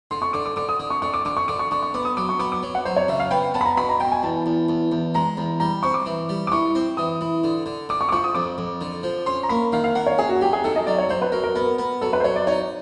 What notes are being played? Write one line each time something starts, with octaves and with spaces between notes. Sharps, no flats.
D3 C6
C#6
D3 D6
D6
D3 D6
D#6
D3
C#6
D3 C#6
D6
D3 D6
C#6
D3 D6
C#6
D3 C#6
C#6
B3 D6
D#6
F#3 D6
C#6
B3 D6
D6
F#3
F#5
F#3 C5
C#5
C#3 E5
F5
B3 G5
B3 A5
B5
A#5
B2 B5
A#5
B2 G5
G#5
E2 A5
E2
E2
E2
G#3 A#5
E2
G3 A#5
C4 C#6
D6
E3
G3
D6
E3 C#6
C4
E3 D#6
E3
D3
D3
D3 D6
C#6
D6
F3 C#6
D#6
F2 D6
F2
D3
F3
C#4 C6
A#5
A#3 B5
D#3 F5
F5
A#3 F#5
C#5
C#4 G#4
F#4
F#3 G4
G#4
D#3 A4
D#5
F#3 D5
C#5
F#3 C5
B4
F#3 A#4
A#4
B3 A#4
B3
F#3 A4
B4
C5
F#3 C#5
D5
D#4 C#5